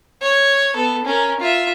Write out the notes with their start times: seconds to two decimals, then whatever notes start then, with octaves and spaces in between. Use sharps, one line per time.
0.22 C#5
0.74 B3 A4
1.05 C#4 A#4
1.40 F4 E5